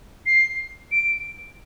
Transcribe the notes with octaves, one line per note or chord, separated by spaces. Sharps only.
C7
D7